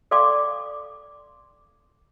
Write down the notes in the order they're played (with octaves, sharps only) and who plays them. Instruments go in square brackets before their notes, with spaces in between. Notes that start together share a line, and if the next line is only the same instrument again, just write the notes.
[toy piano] A4 D5 F5 G5 C6 D6